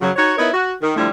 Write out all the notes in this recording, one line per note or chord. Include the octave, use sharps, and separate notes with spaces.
F#2 C#3 F#3
D#4 F#4 C#5
B3 D#4 E4 A#4 C#5
F#4
D#3
D3 F3 G3 A3 E4